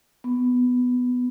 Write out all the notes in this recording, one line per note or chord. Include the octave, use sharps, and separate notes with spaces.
B3